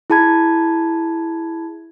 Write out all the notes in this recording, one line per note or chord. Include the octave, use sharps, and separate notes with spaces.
E4 G#4 A5 B5 G#6